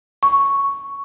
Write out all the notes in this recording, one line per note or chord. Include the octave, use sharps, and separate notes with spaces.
C#6